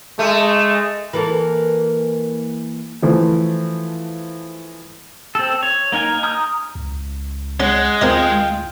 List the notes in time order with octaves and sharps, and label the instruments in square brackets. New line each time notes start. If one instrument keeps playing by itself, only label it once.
[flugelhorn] G#3 [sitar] A3
[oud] E3 A#3 A4
[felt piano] E3 F3 A3
[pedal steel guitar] C4 A4
C#5
A#3 D#4 A#4 G#5
A#5 D#6 F6 G6
[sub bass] C#2
[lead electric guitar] G#3 [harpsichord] C#4 [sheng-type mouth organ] F#5
[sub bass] D2 [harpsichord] C4 A#4 D#5 [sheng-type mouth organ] F4 G5